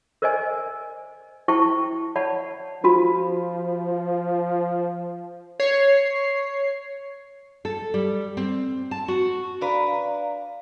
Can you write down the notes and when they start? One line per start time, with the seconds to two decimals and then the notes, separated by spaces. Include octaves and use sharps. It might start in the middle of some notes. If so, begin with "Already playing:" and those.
0.22 A#4 C5 D5 D#5 G#5
1.48 E4 C5 G5 A5 C#6
2.16 C#5 D5 F#5 A5 B5
2.84 F3 F4 F#4 B5
5.60 C#5 C7
7.65 A4
7.94 G3
8.37 C4
8.91 A5
9.08 F#4
9.61 D4 B4 D5 F5 A#5